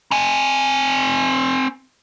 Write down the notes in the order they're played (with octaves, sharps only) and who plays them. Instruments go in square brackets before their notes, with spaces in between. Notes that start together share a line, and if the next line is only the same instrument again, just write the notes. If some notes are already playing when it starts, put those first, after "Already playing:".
[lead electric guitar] C4 G#5